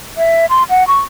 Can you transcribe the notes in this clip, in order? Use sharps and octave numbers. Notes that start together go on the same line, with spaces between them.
E5
C6
F#5
C#6